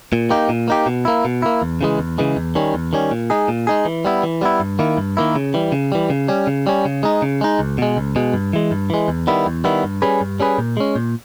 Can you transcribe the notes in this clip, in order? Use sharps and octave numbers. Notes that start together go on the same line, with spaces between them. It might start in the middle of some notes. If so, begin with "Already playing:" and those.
A#2
A#3 D#4 G4
A#2
A#3 D#4 G4
B2
A#3 E4
B2
A#3 E4
E2
C#3 E3 G#3
E2
C#3 E3 G#3
E2
D#3 G3 C#4
E2
D#3 G3 C#4
A#2
G#3 D#4 G#4
A#2
G#3 D#4 G#4
E3
G3 B3 E4
E3
G3 B3 E4
G2
D#3 A#3 E4
G2
D#3 A#3 E4
C#3
E3 G3
C#3
E3 G3
C#3
G3 C#4
C#3
G3 C#4
C#3
G#3 D#4
C#3
G#3 D#4
C#2
B2 G#3
C#2
B2 G#3
G2
E3 G#3
G2
E3 G#3
E2
D#3 G3 B3 E4
E2
D#3 G3 B3 E4
G2
G3 C#4 G#4 B4
G2
G3 C#4 G#4 B4
A#2
G#3 C#4
A#2